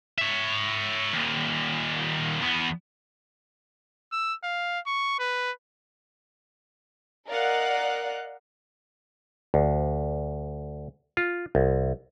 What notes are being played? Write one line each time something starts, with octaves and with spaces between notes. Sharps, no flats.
C#5 E5
D#2 A#2
E2 B3
E6
F5
C#6
B4
A#4 D5 D#5 F5 F#5 F#6
D2
F4
C2